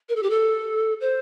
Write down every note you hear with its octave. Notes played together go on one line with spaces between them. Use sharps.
A#4
A4
G4
A4
C5